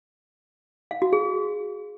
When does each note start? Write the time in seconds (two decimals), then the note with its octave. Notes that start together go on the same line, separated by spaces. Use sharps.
0.91 F5
1.02 F#4
1.13 G#4